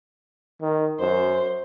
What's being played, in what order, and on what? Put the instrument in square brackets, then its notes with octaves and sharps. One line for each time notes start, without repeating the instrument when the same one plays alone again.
[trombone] D#3
[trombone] F#2 [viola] C5